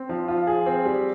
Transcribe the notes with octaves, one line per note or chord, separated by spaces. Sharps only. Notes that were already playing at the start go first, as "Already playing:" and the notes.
Already playing: C4
F3
F4
G#4
C4
G3